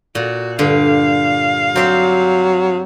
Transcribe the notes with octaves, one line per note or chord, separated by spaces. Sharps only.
A#2 F#4
G2 D3 F5
F#3 C4 G4 C5